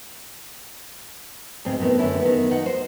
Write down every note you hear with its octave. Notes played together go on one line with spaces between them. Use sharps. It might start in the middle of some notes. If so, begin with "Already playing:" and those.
D2 G#2 C4
A2 D#3 B3 C4
F#2 D3 C#4 E4
D#3 B3
D#2 D#4 F#5
C5